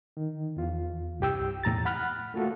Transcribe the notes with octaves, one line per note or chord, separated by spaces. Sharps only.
D#3
E2 F4
C2 G2 G4 G5 E6
E2 A2 A#5 A6
F#5 B5 F6 F#6
A3 A#3 F4 F#4 A4